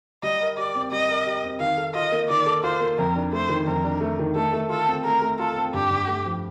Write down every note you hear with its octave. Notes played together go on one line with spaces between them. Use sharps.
G3 D#5
A#4
G4 D5
C4
G3 D#5
A#4
G4
C4
D#3 F5
A4
F4 D#5
A#3
D#3 D5
A4
F4 C5
A#3
F2 A#4
D4
A3 C5
D#3
F2 A#4
D4
A3
D#3
A3 A4
A3
F4 A4
C4
A3 A#4
A3
F4 A4
C4
G2 G4
G2
A3
F3